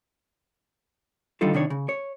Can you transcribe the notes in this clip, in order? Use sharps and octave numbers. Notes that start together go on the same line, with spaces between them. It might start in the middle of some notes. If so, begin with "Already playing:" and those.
D3 D#3 G3 D#4 F4 A4
C3 D#3 D4 C#5
C#3
C#5